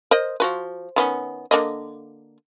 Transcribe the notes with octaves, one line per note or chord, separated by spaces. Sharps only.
A#4 C5 D#5
F3 F#4 B4
D#3 B3 C#4
D3 A#3 D#5